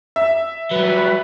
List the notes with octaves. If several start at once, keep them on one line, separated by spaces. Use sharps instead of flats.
E5
F#3 G3 B4